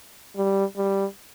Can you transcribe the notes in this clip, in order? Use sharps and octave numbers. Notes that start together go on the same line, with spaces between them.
G3
G3